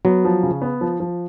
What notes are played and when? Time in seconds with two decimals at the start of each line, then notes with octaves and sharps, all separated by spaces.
0.05 F#3 B3
0.25 F3
0.43 C#3
0.62 B3
0.81 F3
1.00 F3